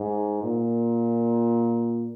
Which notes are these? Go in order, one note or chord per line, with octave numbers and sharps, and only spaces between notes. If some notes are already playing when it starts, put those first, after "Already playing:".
Already playing: G#2
A#2